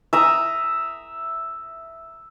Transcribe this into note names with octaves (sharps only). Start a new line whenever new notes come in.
E5 A#5 D#6